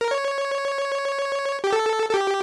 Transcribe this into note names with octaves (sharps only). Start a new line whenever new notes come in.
A#4
C#5
G4
A4
A4
G4